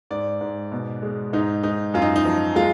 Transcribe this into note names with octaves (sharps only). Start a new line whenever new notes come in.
G#2 D5
G#2
B2
G#3
G#2 D#4
G#2 D#4
F#2 F4
D#4
D#4
F3
G#3 F4